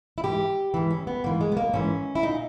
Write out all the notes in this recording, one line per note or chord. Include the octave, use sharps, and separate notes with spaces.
E4
G#2 E3 G4
G#2 E3
C#4
B3
G#2 E3 A#3
G#3
B3
A#3
G#2 E3 C#4
E4
A#2 D#4